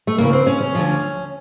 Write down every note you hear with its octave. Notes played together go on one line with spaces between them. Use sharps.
A3
D2 C#3 E3 A#3
C4
C#4
C#4
D2 D3 F3